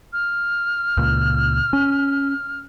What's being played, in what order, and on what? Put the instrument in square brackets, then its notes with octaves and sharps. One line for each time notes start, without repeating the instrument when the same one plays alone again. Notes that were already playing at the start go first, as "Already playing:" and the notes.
[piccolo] F6
[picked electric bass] C#2 A#2
C#4